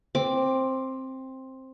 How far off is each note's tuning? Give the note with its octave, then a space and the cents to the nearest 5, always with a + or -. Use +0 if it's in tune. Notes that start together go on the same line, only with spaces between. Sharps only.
C4 +10 D6 +0